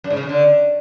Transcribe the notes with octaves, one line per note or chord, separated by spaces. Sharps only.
F#2
G#2
C#3
F2
D3